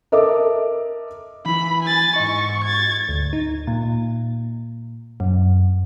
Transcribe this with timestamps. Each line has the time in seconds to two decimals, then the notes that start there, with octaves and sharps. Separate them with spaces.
0.12 A4 A#4 D#5 E5 D6
1.46 E3 E4 B5
1.83 G#5 A6
2.16 G#2 D#5 C#6
2.64 G#6 A6
3.08 D2
3.33 D#4
3.67 A#2
5.20 F#2